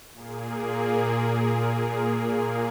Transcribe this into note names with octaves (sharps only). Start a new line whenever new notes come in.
A#2 A#3 G#4